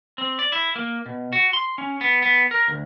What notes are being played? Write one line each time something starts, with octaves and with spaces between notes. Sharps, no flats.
C4
D5
E4
A#3
B2
F#4
C6
C#4
B3
B3
A#4
D2